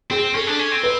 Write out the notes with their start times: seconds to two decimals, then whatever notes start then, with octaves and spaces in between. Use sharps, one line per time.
0.11 C4 G#4
0.35 C#4 A4
0.47 D4
0.59 C#4
0.72 C4
0.83 B4